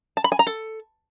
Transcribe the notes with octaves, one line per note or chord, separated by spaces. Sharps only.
A5
B5
G#5
A#5
A4